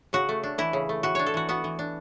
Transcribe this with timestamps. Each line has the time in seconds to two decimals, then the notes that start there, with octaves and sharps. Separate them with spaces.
0.13 C#3 F#4
0.29 A3
0.43 D4
0.58 E3 E4
0.73 C#3
0.89 A3
1.03 E3 F#4
1.15 D4 C#5
1.26 A4
1.34 E3 F#4
1.49 B3 F#4
1.64 E3
1.79 D4